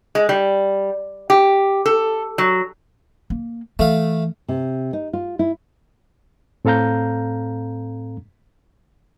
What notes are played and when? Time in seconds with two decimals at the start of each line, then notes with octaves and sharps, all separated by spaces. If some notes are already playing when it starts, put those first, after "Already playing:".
0.15 G#3
0.29 G3
1.30 G4
1.86 A4
2.38 F#3
3.30 A#3
3.79 E3 A3 F5
4.48 C3
4.93 D#4
5.13 F4
5.39 E4
6.65 A2 C4 A4 F5 A#5 G6